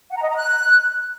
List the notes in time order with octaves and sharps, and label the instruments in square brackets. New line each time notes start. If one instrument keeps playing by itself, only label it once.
[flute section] F#5
A#5
D#5
A#5
F#6